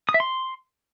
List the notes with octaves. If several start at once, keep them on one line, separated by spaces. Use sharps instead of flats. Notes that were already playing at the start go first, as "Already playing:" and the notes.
D#6
E5
C6